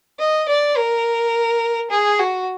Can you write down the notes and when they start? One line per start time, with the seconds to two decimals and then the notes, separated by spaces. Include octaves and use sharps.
0.19 D#5
0.48 D5
0.77 A#4
1.91 G#4
2.19 F#4